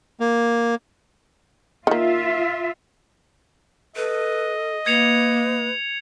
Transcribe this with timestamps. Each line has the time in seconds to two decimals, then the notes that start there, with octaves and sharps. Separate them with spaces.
0.20 A#3
1.87 D#3 A#3 F4 E5
3.96 A4 B4 D#5
4.86 A#3 B4 G#6 C#7 F7